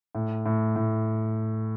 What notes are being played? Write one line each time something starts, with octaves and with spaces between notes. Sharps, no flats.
A2
A2
A2